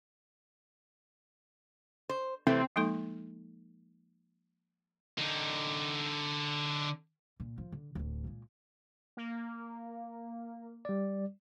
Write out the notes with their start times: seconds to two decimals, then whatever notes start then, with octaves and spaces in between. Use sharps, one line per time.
2.09 C5
2.47 C3 E3 A3 C4
2.76 F3 G#3 A#3 D#4 A4 C6
5.18 D3 D#4
7.40 A#2
7.58 F3
7.72 D3
7.95 D1 D2
8.24 A#2 G#3
9.17 A#3
10.85 G3 D5